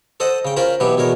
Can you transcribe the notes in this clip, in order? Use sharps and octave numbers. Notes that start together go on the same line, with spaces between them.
A4 C5 D#5 F#5
C#3 G5
C#4 F4 A#4 C5 B5
B2 E3 F#3 G4
E2 B2 A#4 C#5